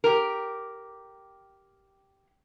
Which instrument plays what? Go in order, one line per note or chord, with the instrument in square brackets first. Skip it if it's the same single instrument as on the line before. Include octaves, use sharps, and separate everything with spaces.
[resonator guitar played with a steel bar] G4 A#4